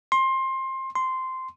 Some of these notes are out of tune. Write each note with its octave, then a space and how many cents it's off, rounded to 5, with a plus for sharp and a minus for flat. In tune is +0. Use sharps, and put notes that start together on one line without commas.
C6 +20
C6 -10